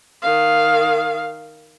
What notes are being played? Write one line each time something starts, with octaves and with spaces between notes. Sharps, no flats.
D#3 F5